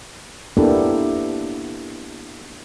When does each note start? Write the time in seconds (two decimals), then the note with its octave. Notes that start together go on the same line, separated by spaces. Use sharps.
0.57 A#3 B3 D4 E4 G4 A4